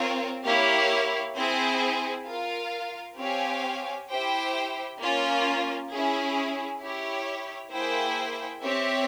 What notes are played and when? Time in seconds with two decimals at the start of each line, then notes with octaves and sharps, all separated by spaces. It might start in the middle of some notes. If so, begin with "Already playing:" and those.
Already playing: C4 F4 A#4 C#5 F5
0.45 A#3 E4 G4 C#5 F5
1.36 C4 E4 G#4 C5
2.27 F4 A#4 F5
3.18 C4 G4 C#5 F5 G#5
4.09 E4 G4 C5 G5
5.00 A#3 C#4 F4
5.91 C#4 E4 G#4
6.82 E4 G4 C#5
7.72 A#3 E4 G#4 C5 G5
8.63 C4 G4 C#5 E5